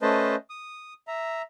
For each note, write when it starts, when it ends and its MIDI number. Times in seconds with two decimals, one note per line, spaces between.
0.02 0.35 57
0.02 0.35 61
0.02 0.35 71
0.02 0.35 72
0.02 0.35 75
0.02 0.35 81
0.50 0.94 87
1.07 1.42 76
1.07 1.42 82